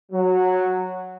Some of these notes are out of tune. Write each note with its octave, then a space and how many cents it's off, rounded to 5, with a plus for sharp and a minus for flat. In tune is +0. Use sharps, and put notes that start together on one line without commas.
F#3 -5